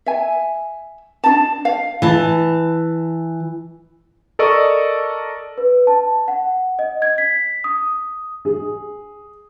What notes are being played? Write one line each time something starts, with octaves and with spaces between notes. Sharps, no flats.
E5 G#5
D4 D#4 A5
F5
E3 A5
A4 A#4 D5 D#5 C#6 E6
B4
A5
F#5
D#5
G#6
B6
D#6
G#4